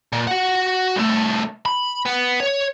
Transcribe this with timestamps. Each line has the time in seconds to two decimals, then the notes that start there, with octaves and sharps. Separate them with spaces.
0.12 A#2
0.27 F#4 F#5
0.96 C2 A3
1.66 B5
2.05 B3
2.40 C#5